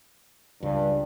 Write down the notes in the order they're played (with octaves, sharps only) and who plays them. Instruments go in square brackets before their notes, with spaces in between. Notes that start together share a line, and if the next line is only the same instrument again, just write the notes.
[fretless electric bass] C#2 C#3 [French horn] G2